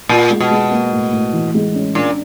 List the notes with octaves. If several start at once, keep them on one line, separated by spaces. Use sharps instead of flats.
A#2 F4
G#3
B2
G#3
A#3
A2
A2
E3
G#3
C#4
A#2 D4